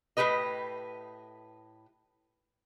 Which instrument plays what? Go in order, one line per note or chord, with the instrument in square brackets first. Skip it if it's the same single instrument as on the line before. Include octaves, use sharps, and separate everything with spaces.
[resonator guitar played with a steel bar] A2 G3 G4 B4 D#5